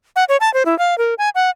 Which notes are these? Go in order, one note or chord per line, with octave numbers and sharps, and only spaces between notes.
F#5
C#5
A5
C5
E4
F5
A#4
G#5
F#5